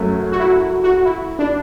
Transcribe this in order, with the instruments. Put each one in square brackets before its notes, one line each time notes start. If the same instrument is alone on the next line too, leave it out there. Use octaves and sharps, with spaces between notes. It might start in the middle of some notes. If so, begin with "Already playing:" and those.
Already playing: [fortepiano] F#2 F#3 A3
[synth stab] F#4
E4
F#4
E4
D4